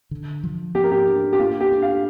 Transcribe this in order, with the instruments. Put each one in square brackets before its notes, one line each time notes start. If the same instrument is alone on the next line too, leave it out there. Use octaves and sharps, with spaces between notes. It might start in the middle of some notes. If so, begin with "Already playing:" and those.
[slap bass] D3
F3
[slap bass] A#3 [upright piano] G4
[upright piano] A#4
G4
[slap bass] D4
[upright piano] G4
[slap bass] A#3 [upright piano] F4
[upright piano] G4
[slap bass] D4
[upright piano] F5